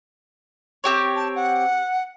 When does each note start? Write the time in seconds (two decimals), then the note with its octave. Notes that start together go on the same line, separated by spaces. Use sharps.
0.84 C4 G4 C#5
1.15 A5
1.35 F#5